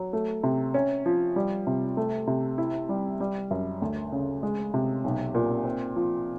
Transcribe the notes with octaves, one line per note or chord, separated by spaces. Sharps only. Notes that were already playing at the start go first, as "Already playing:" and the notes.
Already playing: F#3
A3
C3
C#4
F3
G3
C3
A3
C3
E4
G3
G3
F#2
D2
C#3
G#3
C3
B1
A#2
C4
F3